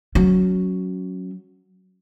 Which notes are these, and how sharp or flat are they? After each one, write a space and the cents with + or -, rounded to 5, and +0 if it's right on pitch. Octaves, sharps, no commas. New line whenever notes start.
F#3 +0 C#4 +0